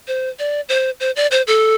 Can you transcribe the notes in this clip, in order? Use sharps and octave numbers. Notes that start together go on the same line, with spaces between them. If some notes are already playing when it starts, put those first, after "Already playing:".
C5
D5
C5
C5
D5
C5
A4